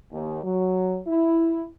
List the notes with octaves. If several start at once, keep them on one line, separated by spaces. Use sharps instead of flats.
D#2
F#3
E4